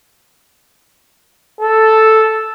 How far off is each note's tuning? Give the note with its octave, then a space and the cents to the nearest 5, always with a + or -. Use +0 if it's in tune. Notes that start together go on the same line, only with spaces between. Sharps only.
A4 +0